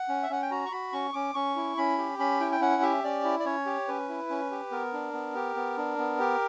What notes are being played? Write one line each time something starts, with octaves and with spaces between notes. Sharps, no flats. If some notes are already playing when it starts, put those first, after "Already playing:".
Already playing: F#5
C#4
E5
C#4 F#5
G5
F#4 A#5
C#6
F#4 B5
C#4 C#6
C#4 D6
C#4 C#6
E4
C#4 B5
G4
C#4 B5
E4 G5
G5
C#4 F#5
G4 E5
C#4 D5
E4
D5
C#4 C#5
G4
C#4 B4
E4
C#4
G4
B3 A#4
D4
B3
G4
B3
D4
B3
G4